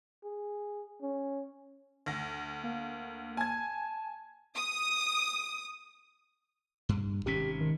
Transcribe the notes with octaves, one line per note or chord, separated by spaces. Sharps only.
G#4
C#4
D2 A#6
A#3
G#5 A5 G#6
D#6
G2
G#1 C3 C#4 G4 B6
D#3